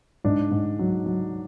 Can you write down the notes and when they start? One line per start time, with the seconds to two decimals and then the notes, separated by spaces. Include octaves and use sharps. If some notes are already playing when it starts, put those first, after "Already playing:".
0.24 G#2 D4
0.52 G#2
0.79 F#3
1.06 F#3